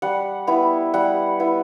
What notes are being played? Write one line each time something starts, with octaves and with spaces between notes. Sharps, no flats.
G3 F#5
B3 E4
G3 F#5
B3 E4